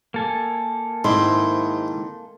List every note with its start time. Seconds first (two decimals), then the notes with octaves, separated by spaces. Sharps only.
0.14 A#3 A4 G#5
1.04 G#2 D#3 C4 E4 C6